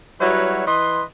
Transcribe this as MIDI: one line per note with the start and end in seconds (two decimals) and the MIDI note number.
0.20 0.62 54
0.20 0.62 55
0.20 0.62 64
0.20 0.62 66
0.20 0.62 71
0.20 0.62 73
0.67 1.02 52
0.67 1.02 71
0.67 1.02 75
0.67 1.02 84